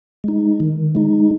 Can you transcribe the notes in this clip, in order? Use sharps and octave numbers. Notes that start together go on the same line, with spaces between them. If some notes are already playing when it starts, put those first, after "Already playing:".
G#3 D#4
D#3
G#3 D#4